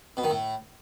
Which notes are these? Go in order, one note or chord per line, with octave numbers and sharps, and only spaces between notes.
B2
D#3
A2